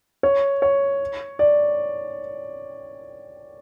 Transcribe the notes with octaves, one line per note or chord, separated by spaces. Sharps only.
C#5
C#5
D5